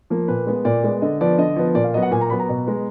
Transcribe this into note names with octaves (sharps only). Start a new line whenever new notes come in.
F3 A#3
A#2 B4
G#3 B3
A#2 D5
G#3 B3
D3 D#5
F3 B3 D5
D3 D#5
F3 B3
A#2 D5
F5
F#3 B3 D#5
F#5
A#2 G#5
A#5
F#3 B3 B5
A#5
B2
G#3 B3